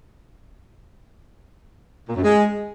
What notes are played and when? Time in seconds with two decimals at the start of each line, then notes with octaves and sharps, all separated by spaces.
2.08 A#2
2.16 F#2
2.23 G#3